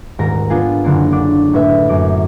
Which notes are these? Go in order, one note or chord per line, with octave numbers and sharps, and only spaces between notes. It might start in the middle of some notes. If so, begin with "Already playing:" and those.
D#1 G#2 A#4 A#5
B3 D4 F4 G#4
F#1 D3 A#3
D4 D6
A2 B4 E5
F#2 D6